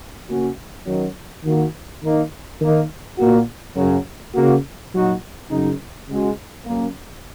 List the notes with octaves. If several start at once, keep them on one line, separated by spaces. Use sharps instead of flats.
C#3 A#3 C#4 F#4
F#2 D#3 F#3
D#3 A#3 F#4
D#3 A#3 D#4
D#3 A#3 D#4
A#2 A#3 F#4
F#2 C#3 F#3
C#3 A#3 F#4
A#2 F#3 D#4 F#4
F#2 C#3 F#3 D#4
C#3 G#3 F#4
F#2 C#3 A#3